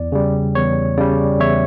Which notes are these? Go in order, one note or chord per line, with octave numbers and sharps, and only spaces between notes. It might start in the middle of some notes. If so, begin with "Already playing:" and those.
Already playing: E2 D5
C#3 G3
E2 C#5
C#3 G3 D5
E2 C#5 E5